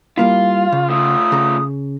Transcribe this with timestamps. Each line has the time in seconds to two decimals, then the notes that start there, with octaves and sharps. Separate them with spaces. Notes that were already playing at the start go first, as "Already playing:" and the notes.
0.17 G3 A#3 E4 F4 F5
0.72 C#3
0.90 A3 F4 D#6
1.32 C#3 A#5